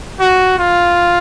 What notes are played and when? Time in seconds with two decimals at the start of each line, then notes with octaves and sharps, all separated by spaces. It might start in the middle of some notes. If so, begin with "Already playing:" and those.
0.20 F#4
0.58 F4